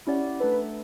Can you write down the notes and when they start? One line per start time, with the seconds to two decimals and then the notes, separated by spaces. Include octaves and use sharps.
0.07 C#4 E4 G4 D5 F#5
0.40 A3 D4 A4 B4